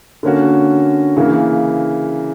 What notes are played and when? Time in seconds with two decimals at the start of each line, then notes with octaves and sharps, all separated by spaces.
0.23 D3 A#3 C#4 F#4
1.17 C#3 E3 A#3